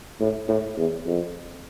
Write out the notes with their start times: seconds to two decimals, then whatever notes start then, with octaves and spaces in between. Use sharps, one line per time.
0.20 A2
0.48 A2
0.78 E2
1.06 F2